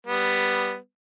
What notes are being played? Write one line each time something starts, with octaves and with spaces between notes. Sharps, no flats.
G3 B3